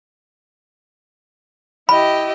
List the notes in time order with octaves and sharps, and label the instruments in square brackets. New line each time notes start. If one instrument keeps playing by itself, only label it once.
[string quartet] E4 G4 D#5 [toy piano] B5